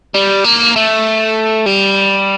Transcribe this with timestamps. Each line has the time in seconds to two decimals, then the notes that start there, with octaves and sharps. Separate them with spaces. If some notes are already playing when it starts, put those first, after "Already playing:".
0.15 G3
0.45 A#3
0.76 A3
1.66 G3